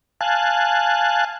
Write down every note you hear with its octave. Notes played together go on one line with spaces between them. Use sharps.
F5 G#5 A5 F#6